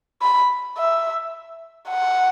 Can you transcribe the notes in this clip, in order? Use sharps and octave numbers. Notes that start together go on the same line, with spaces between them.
B5
E5
F#5